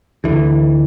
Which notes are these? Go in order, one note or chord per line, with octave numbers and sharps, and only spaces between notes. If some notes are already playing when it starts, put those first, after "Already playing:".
D2 D3 E3